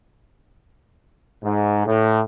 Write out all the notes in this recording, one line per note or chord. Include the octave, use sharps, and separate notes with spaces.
G#2
A2